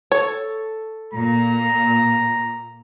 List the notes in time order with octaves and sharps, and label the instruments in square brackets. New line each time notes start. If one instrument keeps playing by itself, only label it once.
[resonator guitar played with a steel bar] A4 [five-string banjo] C#5
[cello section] A#2 [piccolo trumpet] A#5